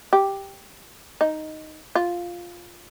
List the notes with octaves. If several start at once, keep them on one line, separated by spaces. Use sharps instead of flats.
G4
D#4
F4